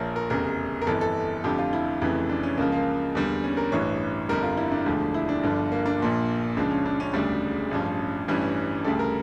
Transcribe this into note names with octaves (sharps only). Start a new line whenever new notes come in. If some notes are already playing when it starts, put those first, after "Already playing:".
Already playing: A#1 A#2 F3 A#4 C#5
A#4
F1 E2 C#3 A#4
A#4
G1 F2 E3 A4
A4
F1 F2 D3 F3 G4
F4
E4
F1 F2 C#3 E3
D4
C#4
C#2 C#3 F3 A#3
A#3
E2 D3 G3
C#4
A#4
A1 G2 E3 C#5
G1 F2 D3 G3 A#4
F4
E4
D4
E1 D2 D3 F3
E4
D4
G1 G2 D3 F3
A#3
D4
A#1 A#2 F3
C#2 C#3 F3 D4
C#4
D4
C#4
E1 D2 C#3 G3 D4
A1 G2 F3 C#4
A1 G2 E3 G3 C#4
D2 C#3 G3 A4
A#4